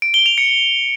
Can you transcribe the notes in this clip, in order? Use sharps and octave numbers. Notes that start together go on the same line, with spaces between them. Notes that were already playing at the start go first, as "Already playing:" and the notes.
D7
G7
F7
C#7